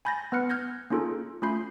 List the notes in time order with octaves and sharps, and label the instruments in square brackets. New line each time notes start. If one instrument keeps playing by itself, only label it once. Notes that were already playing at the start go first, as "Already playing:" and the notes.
[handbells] G#5 B5 G6 A6 A#6
B3 B4 F6 F#6 C#7
F6 G6 G#6 A#6
A#3 C#4 D#4 F4 G#4 A4
A3 C#4 F4 B5 G6 C7